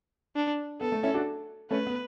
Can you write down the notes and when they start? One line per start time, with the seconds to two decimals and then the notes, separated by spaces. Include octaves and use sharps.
0.36 D4
0.81 B3 A4
0.92 A3
1.03 C#4 E4
1.14 D4 F#4
1.71 A3 C#4 B4
1.87 B3